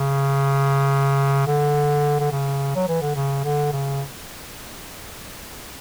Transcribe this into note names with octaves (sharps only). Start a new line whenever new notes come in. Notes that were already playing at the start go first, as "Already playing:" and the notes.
Already playing: C#3
D3
D3
C#3
F#3
E3
D3
C#3
D3
C#3